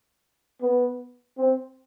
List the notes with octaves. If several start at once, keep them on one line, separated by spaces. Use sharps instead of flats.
B3
C4